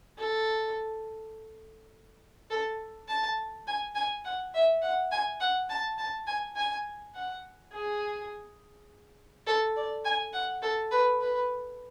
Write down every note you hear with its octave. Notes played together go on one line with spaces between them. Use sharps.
A4
A4
A5
G#5
G#5
F#5
E5
F#5
G#5
F#5
A5
A5
G#5
G#5
F#5
G#4
A4
D5
G#5
F#5
A4
B4
B4